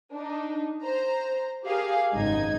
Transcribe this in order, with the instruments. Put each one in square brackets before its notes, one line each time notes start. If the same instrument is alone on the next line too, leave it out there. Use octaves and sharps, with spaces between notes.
[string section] D4 D#4
C5 A#5
G4 G#4 A#4 F5
G#1 C#2 F#2 D#4 G#6